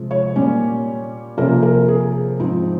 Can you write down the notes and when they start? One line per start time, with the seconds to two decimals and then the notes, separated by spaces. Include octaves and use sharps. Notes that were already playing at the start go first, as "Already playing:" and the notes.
Already playing: C3 F3 G#3
0.11 C#5
0.36 A#2 G3 C#4
1.37 C3 F3 A#3 C#4 A#4
1.63 A#4
1.88 G#4
2.40 G#2 F3 C4 D#4